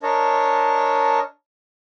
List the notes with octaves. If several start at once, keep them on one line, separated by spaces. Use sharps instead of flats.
D4 A#4 C#5 D#5 A5